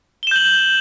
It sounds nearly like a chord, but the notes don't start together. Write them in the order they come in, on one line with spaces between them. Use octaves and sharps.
G7 E7 G6 F#7